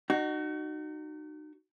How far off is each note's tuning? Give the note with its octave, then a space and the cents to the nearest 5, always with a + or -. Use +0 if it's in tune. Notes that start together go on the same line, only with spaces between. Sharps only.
D#4 -35 F#4 +15